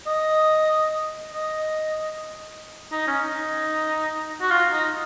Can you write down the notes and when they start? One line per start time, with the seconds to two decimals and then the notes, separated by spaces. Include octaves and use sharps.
0.07 D#5
1.33 D#5
2.92 D#4
3.07 C#4
3.23 D#4
4.41 F#4
4.50 F4
4.72 D#4